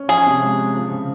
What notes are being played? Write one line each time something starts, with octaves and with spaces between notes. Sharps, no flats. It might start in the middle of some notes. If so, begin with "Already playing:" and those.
Already playing: C#4
F3 G#4
C3
G#3
C4
F3
C#3